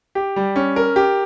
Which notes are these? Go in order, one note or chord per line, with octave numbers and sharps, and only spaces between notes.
G4
G3
C#4
A#4
G4